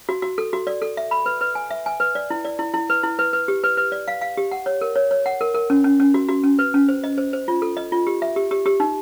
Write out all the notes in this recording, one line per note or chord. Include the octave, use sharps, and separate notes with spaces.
F#4
F#4
A4
F#4
D5
A4
E5
B5
B4
B4
G#5
E5
G#5
B4
D5
E4
D5
E4
E4
B4
E4
B4
B4
G4
B4
B4
D5
F5
F5
G4
F#5
C#5
A#4
C#5
C#5
F#5
A#4
A#4
C#4
C#4
C#4
F#4
F#4
C#4
B4
C#4
C5
D#5
C5
C5
F4
A4
D#5
F4
G4
E5
G4
G4
G4
D#4